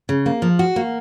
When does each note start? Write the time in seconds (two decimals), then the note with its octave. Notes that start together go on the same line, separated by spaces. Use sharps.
0.09 C#3
0.26 A#3
0.42 F3
0.59 F#4
0.76 A#3